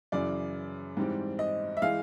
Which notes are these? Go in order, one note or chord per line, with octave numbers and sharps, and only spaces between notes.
F#2 C#3 E3 D5
G#2 E3 G3 C4
D#5
E5
E3 G#3 F5